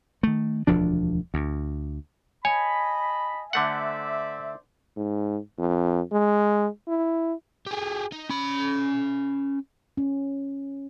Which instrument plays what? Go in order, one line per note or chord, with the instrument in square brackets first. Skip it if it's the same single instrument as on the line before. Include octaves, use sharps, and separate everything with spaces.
[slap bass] D#3 A3
E1 D2 F3 D4
D2
[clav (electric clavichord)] C#5 [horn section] D#5 A5 B5 [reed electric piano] G#5
[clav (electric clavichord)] D3 A3 F#5 [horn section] C5 D5 E5
[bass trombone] G#2
F2
G#3
E4
[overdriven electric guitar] G4 G#4
D#4
C#4 B5
[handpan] C#4